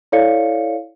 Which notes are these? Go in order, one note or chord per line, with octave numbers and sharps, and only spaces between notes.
E4 A4 C#5 D5 F5 C#7